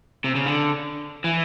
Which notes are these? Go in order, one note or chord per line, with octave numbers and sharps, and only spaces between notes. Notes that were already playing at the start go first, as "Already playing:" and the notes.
C3
C#3
D3
E3